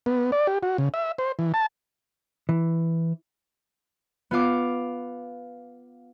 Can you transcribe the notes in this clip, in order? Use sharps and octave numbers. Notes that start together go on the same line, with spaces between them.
B3
D5
G4
F#4
C#3
E5
C5
E3
A5
E3
B3 F4 F5 D6